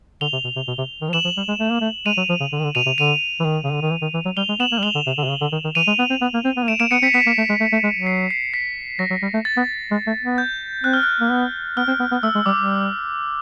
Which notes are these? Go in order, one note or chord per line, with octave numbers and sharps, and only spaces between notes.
D3 F7 G7
C3
B2
C3
B2
C3
D#3
F3
E3 E7 F#7
F3
G3
G#3
A3
A#3
A3
G#3 D#7 F7
F#3
F3
C#3
D3
D#3
D3
B2 D#7 F7
C3
D3 D#7 F7
E3
D#3
C#3
D3
D#3
E3
D#3
E3
F#3
G3 F7 G7
G#3
B3 E7 F#7
A#3
G3
G#3 F7 G7
D3
C3
D3
C3
C#3
D3
D#3
D#3
E3 D#7 F7
G#3
B3
C4
B3
A#3
C4
B3
A#3
A3 D7 E7
A#3 D7 E7
B3 C#7 D#7
C4 B6 C#7
B3 B6 C#7
A#3
A3
G#3
A3
A3
G#3
F#3
C7
C7
B6
F#3 A#6
F#3
G3
A3
A6
B3
G#3
A3
B3
G6
C4 F#6
F6
F#6
A#3
B3
B3 F6
C4
B3
B3
A3 E6
G#3
G3 D6
G3